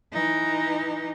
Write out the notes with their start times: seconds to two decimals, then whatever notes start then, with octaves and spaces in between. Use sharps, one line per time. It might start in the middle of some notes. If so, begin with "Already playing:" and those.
0.13 E3 D#4